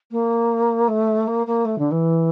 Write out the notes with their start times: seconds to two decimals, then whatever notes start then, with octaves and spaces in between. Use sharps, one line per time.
0.11 A#3
0.88 A3
1.27 A#3
1.47 A#3
1.65 A3
1.78 D3
1.91 E3